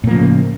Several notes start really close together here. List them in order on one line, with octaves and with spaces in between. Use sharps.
A2 A#3 F3 C#3